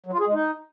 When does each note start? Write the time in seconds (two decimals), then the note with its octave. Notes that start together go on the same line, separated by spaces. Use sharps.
0.06 F#3
0.13 F4
0.20 G#4
0.27 G#3
0.34 D#4